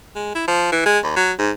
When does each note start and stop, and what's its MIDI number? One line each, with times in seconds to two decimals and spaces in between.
0.15 0.30 56
0.35 0.43 64
0.47 0.71 53
0.72 0.86 52
0.86 0.99 56
1.04 1.13 39
1.16 1.32 54
1.39 1.51 44